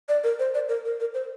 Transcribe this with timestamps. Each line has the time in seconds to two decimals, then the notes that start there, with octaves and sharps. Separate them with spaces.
0.09 D5
0.24 A#4
0.39 C5
0.55 D5
0.69 A#4
0.85 A#4
1.00 A#4
1.14 C5